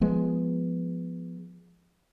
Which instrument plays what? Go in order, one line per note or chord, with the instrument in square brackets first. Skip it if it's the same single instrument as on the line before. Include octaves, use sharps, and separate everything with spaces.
[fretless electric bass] F3 G#3 B3